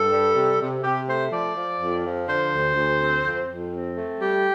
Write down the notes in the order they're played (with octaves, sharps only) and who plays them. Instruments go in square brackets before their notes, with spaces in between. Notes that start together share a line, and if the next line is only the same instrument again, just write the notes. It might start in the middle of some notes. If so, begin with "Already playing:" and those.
Already playing: [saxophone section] G2 A4
G3
C3
C3
C3 G4
A3 C5
F3 D5
F3
F2
F3
D3 C5
D2
D2
C4
F2
F2
C4
A3
G3 G4